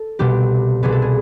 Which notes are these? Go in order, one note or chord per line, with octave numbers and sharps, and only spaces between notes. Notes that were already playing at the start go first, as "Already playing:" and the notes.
Already playing: A4
C2 B2 G3 B3 G4
C2 B2 G3 B3 G#4
A4
G#4